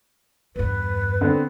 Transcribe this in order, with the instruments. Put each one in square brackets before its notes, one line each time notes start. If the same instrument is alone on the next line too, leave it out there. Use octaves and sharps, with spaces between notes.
[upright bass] E2 G2 [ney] B4
[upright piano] D3 B3 C4